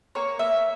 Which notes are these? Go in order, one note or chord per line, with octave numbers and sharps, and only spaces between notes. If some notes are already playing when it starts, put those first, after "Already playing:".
A#3 C#5
A#3 E5